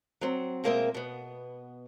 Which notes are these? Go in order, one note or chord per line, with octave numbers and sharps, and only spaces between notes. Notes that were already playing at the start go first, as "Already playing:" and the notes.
F#3 C4
B2 G#3 A#3 C4 A#4 E5
B2 B3